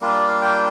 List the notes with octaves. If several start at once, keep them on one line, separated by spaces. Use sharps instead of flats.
G3 A#3 D4 F4
D5
F5
G5